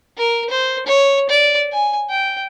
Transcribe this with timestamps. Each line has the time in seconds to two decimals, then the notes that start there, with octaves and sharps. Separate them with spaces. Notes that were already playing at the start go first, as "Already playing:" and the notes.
0.17 A#4
0.50 C5
0.86 C#5
1.29 D5
1.73 G#5
2.10 G5